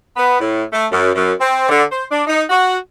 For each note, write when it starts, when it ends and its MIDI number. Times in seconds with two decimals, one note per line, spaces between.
0.16 0.38 59
0.40 0.63 45
0.73 0.87 57
0.92 1.10 42
1.14 1.33 42
1.40 1.66 60
1.69 1.83 50
1.92 2.05 72
2.11 2.23 62
2.27 2.42 63
2.50 2.77 66